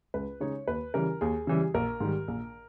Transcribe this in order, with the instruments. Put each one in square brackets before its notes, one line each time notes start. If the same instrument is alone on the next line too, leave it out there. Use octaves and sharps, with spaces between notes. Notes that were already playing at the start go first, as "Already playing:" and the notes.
[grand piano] C#2 B4
C#3 G#3 D#4 C#5
D#2 B4
C#3 E3 G3 A#4
D#2 G#4
C#3 E3 G3
A#1 A#4
G#2 D#3 G3
A#1